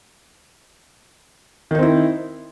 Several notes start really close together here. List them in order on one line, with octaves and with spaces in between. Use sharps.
D#3 D#4 C4 E4